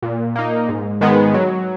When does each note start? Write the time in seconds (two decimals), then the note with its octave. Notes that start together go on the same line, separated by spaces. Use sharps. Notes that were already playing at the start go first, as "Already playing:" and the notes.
0.02 A#2
0.36 A#3 D#4
0.69 G#2
1.01 D#3 G#3 B3
1.34 F#3